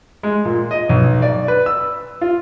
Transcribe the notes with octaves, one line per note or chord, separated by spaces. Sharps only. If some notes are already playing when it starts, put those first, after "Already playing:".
G#3
A#2
D#5
B1
D5
B4
E6
F4